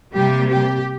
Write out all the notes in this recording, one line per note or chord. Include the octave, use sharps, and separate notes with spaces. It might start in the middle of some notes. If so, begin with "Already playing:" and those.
C3 G3 A#3 G4
G4